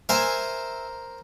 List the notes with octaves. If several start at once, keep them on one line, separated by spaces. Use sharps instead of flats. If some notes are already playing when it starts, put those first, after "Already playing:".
A#4 C5 E5 G#5 A#5